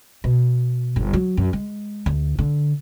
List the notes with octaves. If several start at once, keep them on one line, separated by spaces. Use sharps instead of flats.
B2
G1
F#3
F#2
G#3
D2
D3